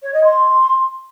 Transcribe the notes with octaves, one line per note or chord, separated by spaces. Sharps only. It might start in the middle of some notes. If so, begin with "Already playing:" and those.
C#5
D#5
C6